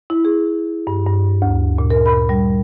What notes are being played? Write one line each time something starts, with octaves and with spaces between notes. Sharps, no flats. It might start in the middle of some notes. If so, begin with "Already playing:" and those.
E4
G#4
G2
G2
D2
A#2
A#4
B5
G3